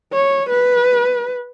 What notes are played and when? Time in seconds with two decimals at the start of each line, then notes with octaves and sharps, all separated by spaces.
0.13 C#5
0.49 B4